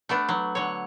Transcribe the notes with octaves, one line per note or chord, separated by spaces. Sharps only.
A3 B3 D4
F#3
D3 C#5